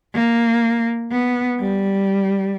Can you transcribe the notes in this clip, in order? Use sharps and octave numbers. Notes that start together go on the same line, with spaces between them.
A#3
B3
G3